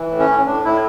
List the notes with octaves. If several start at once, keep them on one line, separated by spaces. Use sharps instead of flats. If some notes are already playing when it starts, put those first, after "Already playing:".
Already playing: E3
A2
C#4
A2
A2 D4
A2 E4